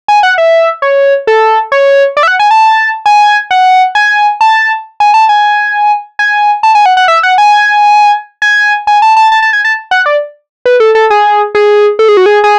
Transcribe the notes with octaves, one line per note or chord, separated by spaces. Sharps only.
G#5
F#5
E5
C#5
A4
C#5
D5
E5
F#5
G#5
A5
G#5
F#5
G#5
A5
G#5
A5
G#5
G#5
A5
G#5
F#5
F#5
E5
F#5
G#5
G#5
G#5
A5
A5
A5
A5
G#5
A5
F#5
D5
B4
A4
A4
G#4
G#4
A4
G#4
F#4
G#4
G#4